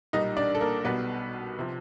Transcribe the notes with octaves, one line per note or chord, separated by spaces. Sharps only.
B1 A#2 G3 D#4 D#5
D4 D5
A4
A#3 A#4
B1 B2 G3 B3 B4
C3 F3